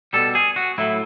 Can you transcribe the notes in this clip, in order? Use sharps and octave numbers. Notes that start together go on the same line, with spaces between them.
B2 G3 A4
G#4
F#4
A2 F#3 E4